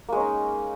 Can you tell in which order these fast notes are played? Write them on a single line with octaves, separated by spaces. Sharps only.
A#3 G#3 C#4 D#4